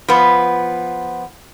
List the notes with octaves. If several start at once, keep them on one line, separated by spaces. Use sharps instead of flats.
F3 B3